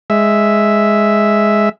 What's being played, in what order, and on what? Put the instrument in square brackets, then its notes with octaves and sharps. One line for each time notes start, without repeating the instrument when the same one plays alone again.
[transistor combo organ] G#3 E5